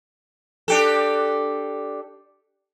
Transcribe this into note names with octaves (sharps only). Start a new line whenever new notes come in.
D4 G4 A4